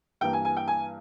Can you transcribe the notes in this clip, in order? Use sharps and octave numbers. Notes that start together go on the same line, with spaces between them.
G2 E3 A#3 G5
G#5
G#5
G5
G#5